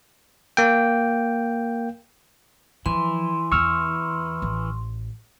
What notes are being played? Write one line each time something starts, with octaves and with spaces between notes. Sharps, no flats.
A#3 G5
E3 F3 C6
E2 E4 C#6 E6 F6
A1